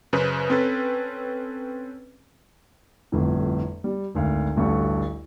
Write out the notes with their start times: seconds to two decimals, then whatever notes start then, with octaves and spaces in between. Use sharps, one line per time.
0.13 F#2 C#3 B4 C5
0.50 C4 C#4 A4 B4
3.12 G1 F2 A2
3.84 G3
4.15 G#1 D2 F5
4.56 A1 D2 G2 F#4 A4 C#6